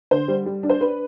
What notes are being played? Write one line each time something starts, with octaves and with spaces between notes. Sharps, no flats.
D3 C5
G3
G3
D4
C5
D4 B4